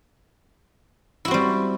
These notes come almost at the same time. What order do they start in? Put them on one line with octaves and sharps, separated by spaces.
E4 F#4 C4 G3